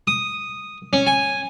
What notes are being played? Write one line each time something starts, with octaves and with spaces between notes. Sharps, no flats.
D#6
C#4
G#5